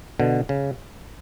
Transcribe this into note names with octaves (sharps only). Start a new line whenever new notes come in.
B2 D3
C#3